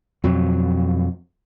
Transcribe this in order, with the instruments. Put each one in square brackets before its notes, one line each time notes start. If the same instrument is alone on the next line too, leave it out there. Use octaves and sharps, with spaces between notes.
[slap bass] F2 B2 F#3